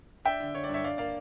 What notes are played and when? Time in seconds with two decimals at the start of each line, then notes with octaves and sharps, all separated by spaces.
0.25 D4 E5 G5
0.40 D3
0.54 D3 C#5
0.64 D5
0.69 G2
0.74 C#5 E5
0.84 G2 D5 F5
0.98 A#3 D5 F5